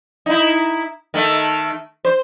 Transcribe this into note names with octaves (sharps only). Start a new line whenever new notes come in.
D#4 E4
D#3 A3
C5